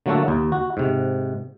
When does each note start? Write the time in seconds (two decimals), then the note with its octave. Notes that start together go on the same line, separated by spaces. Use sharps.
0.06 D3 F#3 A3 A#3 F#4 A4
0.28 D#2
0.52 F#4
0.77 G#2 C3